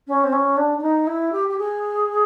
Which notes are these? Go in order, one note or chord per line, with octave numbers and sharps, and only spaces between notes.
C#4
C4
C#4
D4
D4
D#4
E4
G4
G4
G#4